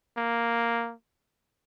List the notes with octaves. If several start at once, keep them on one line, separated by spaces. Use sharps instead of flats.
A#3